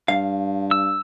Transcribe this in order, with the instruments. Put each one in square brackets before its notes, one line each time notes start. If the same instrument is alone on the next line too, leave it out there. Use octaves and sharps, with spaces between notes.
[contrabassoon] G2 [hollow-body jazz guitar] F5
[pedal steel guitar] E6